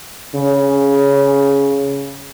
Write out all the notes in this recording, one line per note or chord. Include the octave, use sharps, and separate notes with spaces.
C#3